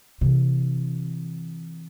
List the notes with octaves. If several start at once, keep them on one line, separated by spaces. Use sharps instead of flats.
C3 E3